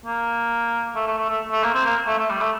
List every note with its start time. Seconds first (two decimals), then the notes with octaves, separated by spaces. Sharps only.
0.06 A#3
0.96 A3
1.07 A3
1.18 A3
1.30 A3
1.51 A3
1.63 A#3
1.74 C4
1.85 A#3
2.07 A3
2.18 A3
2.30 G3
2.41 A3